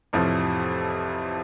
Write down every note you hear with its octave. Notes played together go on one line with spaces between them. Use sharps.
A1 F2 C3 F3